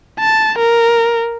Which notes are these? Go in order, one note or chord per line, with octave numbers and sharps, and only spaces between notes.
A5
A#4